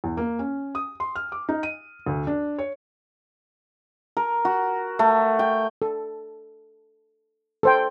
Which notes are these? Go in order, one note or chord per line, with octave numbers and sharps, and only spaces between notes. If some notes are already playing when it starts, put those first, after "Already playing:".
E2
A#3
C#4
D#6
C6
F6
D6
D#4
D#7
D2
D4
C#5
A#4
F#4
A3
G5
A4
A4 C5 G5